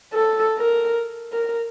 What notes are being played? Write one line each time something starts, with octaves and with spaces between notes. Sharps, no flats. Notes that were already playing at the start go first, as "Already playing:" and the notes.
A4
A#4
A#4